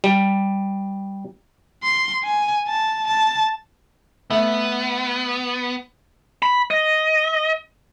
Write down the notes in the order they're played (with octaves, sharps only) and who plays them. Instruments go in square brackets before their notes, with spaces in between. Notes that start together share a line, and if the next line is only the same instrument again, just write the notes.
[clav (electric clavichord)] G3
[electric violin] C6
G#5
A5
A5
[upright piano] A3 [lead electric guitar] B3
[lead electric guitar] B5
D#5